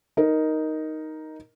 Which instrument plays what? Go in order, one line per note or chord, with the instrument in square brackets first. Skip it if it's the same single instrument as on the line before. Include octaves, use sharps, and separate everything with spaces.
[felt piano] D#4 A#4